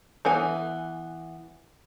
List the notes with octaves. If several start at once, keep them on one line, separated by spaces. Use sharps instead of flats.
E3 B3 G#5